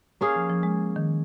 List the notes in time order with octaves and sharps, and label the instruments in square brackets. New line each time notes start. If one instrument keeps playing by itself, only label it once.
[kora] A#3 C#4 G#4 F5
[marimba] F3
F3
G#3
D#3